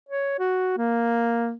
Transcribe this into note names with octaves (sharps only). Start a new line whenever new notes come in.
C#5
F#4
A#3